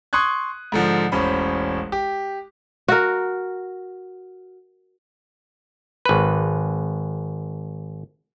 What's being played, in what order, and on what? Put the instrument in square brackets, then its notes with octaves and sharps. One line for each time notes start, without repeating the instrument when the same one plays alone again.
[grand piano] C6 C#6 D#6 F#6 G#6
G#2 D3 F3
E1 A1 C#4 C5 B5
G4
[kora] F#4 A#4
[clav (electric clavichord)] G#1 B4